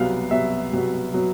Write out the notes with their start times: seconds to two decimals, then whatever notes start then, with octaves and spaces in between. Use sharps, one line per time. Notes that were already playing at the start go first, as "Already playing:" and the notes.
Already playing: C2 B2 F#3 B3 F5
0.31 C2 B2 F#3 B3 E5
0.73 C2 B2 F#3 B3
1.14 B2 F#3 B3